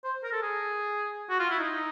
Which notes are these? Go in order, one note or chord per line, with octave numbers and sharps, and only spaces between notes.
C5
A#4
A4
G#4
F#4
F4
E4
D#4